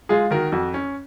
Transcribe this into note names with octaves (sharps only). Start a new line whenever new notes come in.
G#3 F4 G#4
D#3 F#4 A#4
F2 F#4
C#4